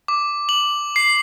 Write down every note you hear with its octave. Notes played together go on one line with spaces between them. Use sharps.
D6
F#7
C7